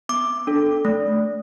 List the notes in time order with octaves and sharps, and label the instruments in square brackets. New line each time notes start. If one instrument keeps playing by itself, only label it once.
[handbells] B3 D6
D4 A4
A3